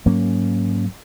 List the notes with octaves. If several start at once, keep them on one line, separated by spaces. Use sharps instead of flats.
G#2 F#3 A#3 C#4